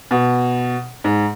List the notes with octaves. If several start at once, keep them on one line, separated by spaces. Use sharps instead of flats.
B2
G#2